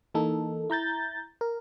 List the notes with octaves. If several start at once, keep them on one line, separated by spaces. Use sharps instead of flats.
E3 A#3 D#4 A4
E4 A#5 G6 A6
A#4